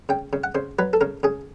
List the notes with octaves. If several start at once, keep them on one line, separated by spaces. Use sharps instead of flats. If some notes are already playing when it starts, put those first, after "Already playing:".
C#3 G5
C#3
F#5
C#3 C5
F#3 B4
A4
C#3 A#4
C#3 G#4